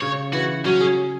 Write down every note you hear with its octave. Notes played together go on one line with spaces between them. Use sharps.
C#3 C#5
E3 F#4
F#3 C#4
G#4